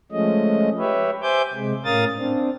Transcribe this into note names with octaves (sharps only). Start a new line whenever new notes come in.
F3 G#3 A3 C#4 D#5
G4 B4 C#5 E5
C5 E5 G#5 D6 G6
C3 G#3
A2 C#4 A#4 F5 D#6 A6
C4 D4